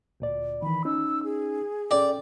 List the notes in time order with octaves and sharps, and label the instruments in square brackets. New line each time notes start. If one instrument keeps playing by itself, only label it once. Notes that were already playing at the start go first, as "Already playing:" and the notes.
[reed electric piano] D2 A#2 D5
[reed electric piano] D#3 E3 [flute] B5
[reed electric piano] C#4 D#4 [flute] E6
[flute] G#4
[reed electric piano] C#4 A4 G5 [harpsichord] D5